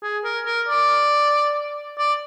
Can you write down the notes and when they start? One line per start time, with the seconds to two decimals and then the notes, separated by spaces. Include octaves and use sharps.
0.03 G#4
0.25 A#4
0.46 A#4
0.69 D5
1.99 D5